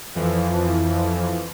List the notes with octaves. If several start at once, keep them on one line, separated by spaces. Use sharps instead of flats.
F2 E3 F3